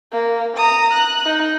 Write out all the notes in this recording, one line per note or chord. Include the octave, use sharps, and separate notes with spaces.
A#3
A#5 D#6
F#6
D#4